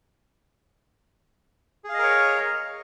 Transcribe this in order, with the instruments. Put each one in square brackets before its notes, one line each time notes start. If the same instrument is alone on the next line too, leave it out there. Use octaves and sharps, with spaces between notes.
[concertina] G#4
F5
D#5
A#4
C#5